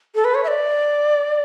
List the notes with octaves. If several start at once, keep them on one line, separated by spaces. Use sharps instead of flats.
A4
B4
C#5
E5
D5